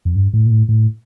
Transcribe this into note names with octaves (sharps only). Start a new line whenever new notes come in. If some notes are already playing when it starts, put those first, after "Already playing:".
F2
G2
A2
A#2
A2
A2